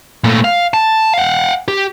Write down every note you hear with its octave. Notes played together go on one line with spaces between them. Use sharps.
A#2 A3
F5
A5
F5 F#5
G4